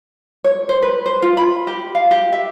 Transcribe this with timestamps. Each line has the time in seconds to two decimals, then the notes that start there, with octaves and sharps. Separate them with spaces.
0.44 C#5
0.69 C5
0.82 B4
1.06 C5
1.22 F4
1.37 B5
1.67 G4
1.95 F5
2.11 G4
2.32 E5